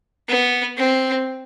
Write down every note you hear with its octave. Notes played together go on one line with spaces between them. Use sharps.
B3
C4